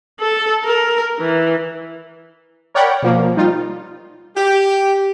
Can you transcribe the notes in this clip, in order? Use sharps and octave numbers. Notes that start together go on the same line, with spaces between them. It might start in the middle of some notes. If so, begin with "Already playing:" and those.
A4
A#4
E3
A#4 C#5 D5 F#5 G5 B5
B2 F3 A#3
G3 D#4 F4
G4